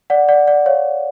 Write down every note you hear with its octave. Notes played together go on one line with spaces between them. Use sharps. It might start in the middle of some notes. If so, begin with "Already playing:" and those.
D5 F#5
D5 F#5
D5 F#5
C#5 F5